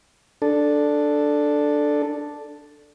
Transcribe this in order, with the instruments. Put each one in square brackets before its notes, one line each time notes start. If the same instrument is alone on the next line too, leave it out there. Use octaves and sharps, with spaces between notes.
[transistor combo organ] D4 A4